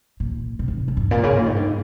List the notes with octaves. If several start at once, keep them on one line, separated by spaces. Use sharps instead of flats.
A#2
C3
G#2
F2
G2
A#2
C#3
A#2
G#2
G2